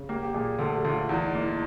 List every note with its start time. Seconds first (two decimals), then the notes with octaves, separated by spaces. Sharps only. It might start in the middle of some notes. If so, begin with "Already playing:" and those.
Already playing: C#3
0.09 A#3 G4
0.23 G4
0.34 A#2 G#4
0.59 D2 A4
0.76 G4
0.85 D2
0.93 F4
1.09 E2 E4
1.25 D#4
1.34 A#3
1.43 E4